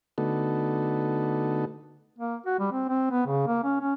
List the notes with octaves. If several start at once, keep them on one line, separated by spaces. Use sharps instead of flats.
D3 A3 B3 D#4 F#4 A4
A#3
F#4
G3
C4
C4
B3
C#3
A#3
C#4
C#4